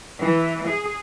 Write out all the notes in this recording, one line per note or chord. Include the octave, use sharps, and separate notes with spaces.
E3
G#4